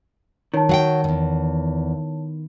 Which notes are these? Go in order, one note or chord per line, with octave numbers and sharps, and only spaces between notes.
D#3 C#5 A5
F#3 F#5 G5
E2 G2